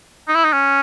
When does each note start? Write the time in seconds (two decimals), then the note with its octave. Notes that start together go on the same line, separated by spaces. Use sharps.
0.28 D#4
0.35 E4
0.44 D#4
0.53 C#4